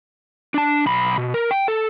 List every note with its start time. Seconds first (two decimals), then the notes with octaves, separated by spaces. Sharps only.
0.54 D4 A5
0.86 B1 B5
1.18 B2
1.34 A#4
1.51 G5
1.68 A4